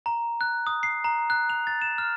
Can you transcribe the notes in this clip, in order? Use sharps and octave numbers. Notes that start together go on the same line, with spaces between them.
A#5
F#6
D#6
C7
A#5
F#6
F7
A6
E7
F6